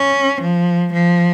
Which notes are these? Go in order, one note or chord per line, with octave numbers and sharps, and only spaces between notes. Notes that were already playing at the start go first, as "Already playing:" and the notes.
Already playing: C#4
F3
F3